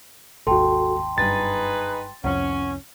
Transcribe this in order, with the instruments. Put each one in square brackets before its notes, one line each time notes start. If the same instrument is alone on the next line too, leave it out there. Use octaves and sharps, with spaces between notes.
[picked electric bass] G#1 D#2 [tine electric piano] F#4 A4 [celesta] G5 A5 C6
[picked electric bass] F#1 G2 [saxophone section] D#4 G#4 B4 [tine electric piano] A6
[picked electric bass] C2 F2 [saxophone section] C#4 [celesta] F#5